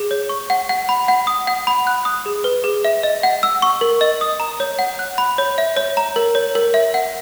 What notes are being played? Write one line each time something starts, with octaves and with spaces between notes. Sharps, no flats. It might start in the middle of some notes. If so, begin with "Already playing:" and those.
Already playing: G#4
C#5
C#6
F#5
F#5
B5
F#5
D#6
F#5
B5
F#6
D#6
G#4
B4
G#4
E5
D#5
F#5
E6
C#6
A#4
D#5
D#6
A#5
C#5
F#5
F#6
B5
C#5
E5
C#5
A#5
A#4
C#5
A#4
E5
F#5